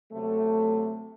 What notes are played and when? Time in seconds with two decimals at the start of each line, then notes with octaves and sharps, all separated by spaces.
0.12 C3 F#3 A3